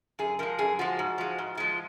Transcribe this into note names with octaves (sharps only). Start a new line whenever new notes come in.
F#2 G#4
F3 G#3 A#4
F#2 G#4
F3 G#3 F#4
G#2
F3 G#3
G#2
F3 G#3